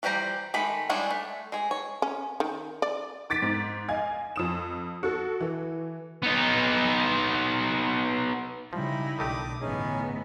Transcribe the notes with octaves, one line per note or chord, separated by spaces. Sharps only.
E3 F3 G3 G4 A#5
D#3 G#3 A3 B5
G3 G#3 D4 E4 C#5
A3
G#3 G#4
C#5
C#4
D#3
D5
D6 A6 B6 D7
G#2
D#5 F5 G#5 G#6
F2 D#6 E7
F#4 A4
E3
B3 D#4
C#3 F3 G3 D#4 E4
B1 D#3 A3 D4 G4 D6 D#6
G1 A2 E3 B3 C#4 D#4 G#4